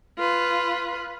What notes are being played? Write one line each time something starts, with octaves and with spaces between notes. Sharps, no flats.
F4 B4